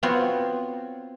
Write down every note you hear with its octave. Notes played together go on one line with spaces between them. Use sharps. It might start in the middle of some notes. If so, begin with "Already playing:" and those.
B3 C4 F4 F#4 C5 C#5